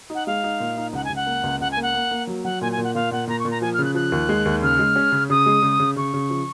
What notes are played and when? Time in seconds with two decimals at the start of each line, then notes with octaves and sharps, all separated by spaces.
0.10 D#4 F#5
0.26 G#3 F5
0.44 D#4
0.60 A#2
0.77 D#4
0.93 C#2 F#5
1.04 G#5
1.10 C#2
1.16 F#5
1.26 A#3
1.44 C#2
1.60 C#2 F#5
1.71 G#5
1.77 A#3
1.82 F#5
1.94 A#3
2.11 A#3
2.27 F#3
2.44 F#3 F#5
2.61 A#2 G#5
2.72 G#5
2.78 A#2
2.83 F#5
2.94 A#2 F5
3.11 A#2 F#5
3.27 A#2 A#5
3.39 C#6
3.45 A#2
3.50 A#5
3.61 F3 G#5
3.73 F6
3.79 C#3
3.84 F#6
3.95 F3 F#6
4.12 D#2
4.29 G#3
4.45 D#2
4.62 C#3 F6
4.79 G#3
4.96 C#4
5.12 C#3
5.30 C#3 D#6
5.46 G#3
5.62 C#3
5.80 C#3
5.96 C#3 C#6
6.14 C#3
6.30 F3